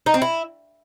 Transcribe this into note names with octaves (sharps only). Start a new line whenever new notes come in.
D#4
C4
E4